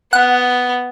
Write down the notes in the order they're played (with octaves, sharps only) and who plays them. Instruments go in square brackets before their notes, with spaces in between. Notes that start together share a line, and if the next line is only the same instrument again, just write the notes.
[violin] B3 [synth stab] F#5